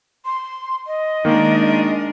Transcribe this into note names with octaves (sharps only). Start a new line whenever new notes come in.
C6
D#5
D#3 G#3 A#3 D4 A#4